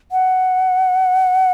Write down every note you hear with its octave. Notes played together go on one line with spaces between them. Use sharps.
F#5